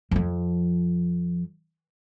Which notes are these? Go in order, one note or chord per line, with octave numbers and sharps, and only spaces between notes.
F2 F3